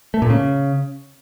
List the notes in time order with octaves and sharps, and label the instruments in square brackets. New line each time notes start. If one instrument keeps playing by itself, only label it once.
[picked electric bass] A3
A#2
C#3